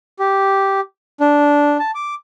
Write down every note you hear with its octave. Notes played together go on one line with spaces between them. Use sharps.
G4
D4
A5
D6